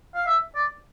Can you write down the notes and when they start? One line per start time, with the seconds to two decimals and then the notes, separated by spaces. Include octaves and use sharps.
0.15 F5
0.26 E5
0.55 D5